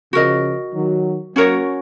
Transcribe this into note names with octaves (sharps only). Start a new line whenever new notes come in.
C#3 F3 F#4 A#4 D#5
D#3 F#3
F#3 A#3 C#4 F#4 A#4 C#5